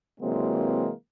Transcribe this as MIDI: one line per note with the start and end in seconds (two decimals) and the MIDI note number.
0.21 0.91 48
0.21 0.91 52
0.21 0.91 54
0.21 0.91 56
0.21 0.91 58
0.21 0.91 60